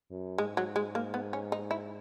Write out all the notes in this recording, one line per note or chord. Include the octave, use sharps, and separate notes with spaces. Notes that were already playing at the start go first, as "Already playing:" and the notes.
F#2
G#2 G#3
F#3
G#3
A#3
B3
C#4
D#4
E4